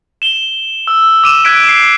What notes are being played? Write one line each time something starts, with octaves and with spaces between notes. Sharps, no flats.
E7 G7
E6
D6 D#7 E7
F#6 G#6 B6 D7
C7 E7